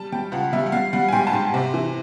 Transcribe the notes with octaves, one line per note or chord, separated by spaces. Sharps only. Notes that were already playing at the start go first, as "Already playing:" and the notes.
Already playing: G3 A5
G3 G5
C#2 F#5
G3 E5
F#5
G3 F5
G3 F#5
G#5
G#2 G5
A5
G#2
C3
E3